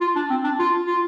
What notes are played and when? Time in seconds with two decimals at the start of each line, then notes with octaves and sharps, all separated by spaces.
0.01 F4
0.16 D4
0.30 C4
0.44 D4
0.59 F4
0.87 F4